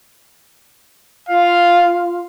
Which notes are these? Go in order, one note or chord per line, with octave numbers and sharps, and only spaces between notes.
F4 F5